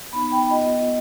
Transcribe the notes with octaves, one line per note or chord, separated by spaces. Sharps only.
B3 D#4 B5
G5
B3 F4 D#5